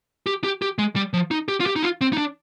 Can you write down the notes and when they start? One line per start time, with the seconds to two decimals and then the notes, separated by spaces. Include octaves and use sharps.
0.26 G4
0.44 G4
0.62 G4
0.78 G#3
0.96 G3
1.13 F3
1.31 D#4
1.48 G4
1.60 F4
1.66 G4
1.76 D#4
1.83 F4
2.01 C4
2.13 D#4
2.17 D4